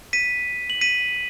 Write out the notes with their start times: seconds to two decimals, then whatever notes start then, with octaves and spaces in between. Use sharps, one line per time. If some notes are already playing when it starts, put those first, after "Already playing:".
0.13 B6 D#7
0.70 F#7
0.81 B6 D#7